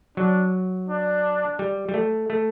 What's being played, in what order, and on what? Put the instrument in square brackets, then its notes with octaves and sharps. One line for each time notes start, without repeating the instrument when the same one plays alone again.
[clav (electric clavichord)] F#3 [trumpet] D4
[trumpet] D4
[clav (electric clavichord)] G3
G3
A3
A3